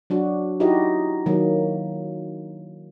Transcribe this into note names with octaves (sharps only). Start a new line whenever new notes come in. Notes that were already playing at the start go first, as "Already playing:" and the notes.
F#3 D4 F#4
D#4 E4 F#4 G4 D#5
D#3 F#3 A#3